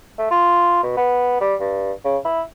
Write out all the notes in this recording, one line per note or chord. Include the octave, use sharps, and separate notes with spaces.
A3
F4
B2
B3
G3
G2
C#3
E4